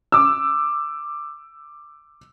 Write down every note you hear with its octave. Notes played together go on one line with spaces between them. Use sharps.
D6 E6